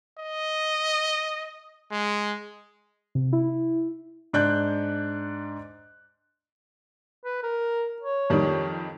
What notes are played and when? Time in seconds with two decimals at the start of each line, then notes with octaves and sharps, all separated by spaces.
0.19 D#5
1.92 G#3
3.15 C3
3.33 E4
4.33 G#2 D4 D5 F#6 G6
7.23 B4
7.43 A#4
8.02 C#5
8.30 F2 D#3 G3